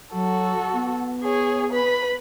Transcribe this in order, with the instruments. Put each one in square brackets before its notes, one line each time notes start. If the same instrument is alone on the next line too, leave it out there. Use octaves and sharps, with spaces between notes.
[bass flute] F#3 [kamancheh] F#4 A4
[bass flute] B3
[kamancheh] G#4 C#5
B4 B5